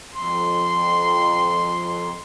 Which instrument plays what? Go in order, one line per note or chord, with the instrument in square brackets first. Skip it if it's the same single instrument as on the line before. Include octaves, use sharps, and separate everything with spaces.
[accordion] F2 [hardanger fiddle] C6